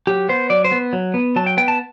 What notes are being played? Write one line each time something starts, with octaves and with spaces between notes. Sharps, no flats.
F#3 G4
B3 C5
F#3 D5
C5
B3
F#3
B3
F#3 A5
G5
B3 G5
A5